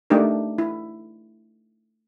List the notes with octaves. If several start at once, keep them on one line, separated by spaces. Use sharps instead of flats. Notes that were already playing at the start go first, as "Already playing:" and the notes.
A3 D4 D#4 G4 A#4
E4